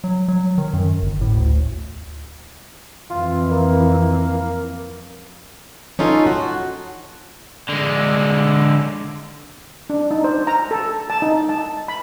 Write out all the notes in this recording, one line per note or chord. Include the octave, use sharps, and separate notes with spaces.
F#3
F#3
D#3
F#2
G1
A2
D2
F2 E3 F4
A#3
C#4 D#4 F4 A4
F#4
D3 G#3
D4
D#4
C5
A#5
A4
A5
D#4
A5
B5